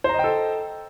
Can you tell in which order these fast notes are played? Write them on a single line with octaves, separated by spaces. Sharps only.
C5 A#5 D#5 G5 A4